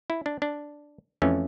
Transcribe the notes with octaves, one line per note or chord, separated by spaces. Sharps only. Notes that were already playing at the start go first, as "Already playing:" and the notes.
E4
D4
D4
F2 E3 A3 C#4